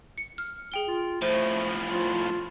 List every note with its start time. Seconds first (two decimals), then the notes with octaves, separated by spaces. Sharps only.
0.18 C#7
0.38 F6
0.72 G#4 G5 G7
0.88 F4
1.22 A2 F3 A3 C5
1.91 F4